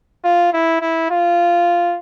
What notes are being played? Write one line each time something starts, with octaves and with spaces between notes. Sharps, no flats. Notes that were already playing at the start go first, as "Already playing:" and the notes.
F4
E4
E4
F4